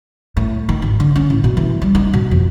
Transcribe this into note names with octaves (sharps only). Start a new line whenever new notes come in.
A2
D#3
G#1
D3
C#4
A2
B2
E3
G3
D#4
B2
F2